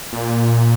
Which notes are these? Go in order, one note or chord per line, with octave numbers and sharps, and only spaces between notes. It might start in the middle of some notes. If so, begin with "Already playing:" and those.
A#2